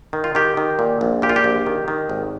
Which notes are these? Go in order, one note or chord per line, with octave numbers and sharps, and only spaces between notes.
D#3
F4
D#3 G4
D#3
A#2
A#1
A#2 G4
F4
G4
A#1
D#3
D#3
G#1